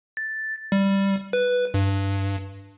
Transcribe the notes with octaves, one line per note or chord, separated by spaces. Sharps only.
A6
G3
B4
G2